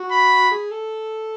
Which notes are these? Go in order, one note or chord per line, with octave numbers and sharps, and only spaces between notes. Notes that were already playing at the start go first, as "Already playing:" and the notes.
Already playing: F#4
B5
G#4
A4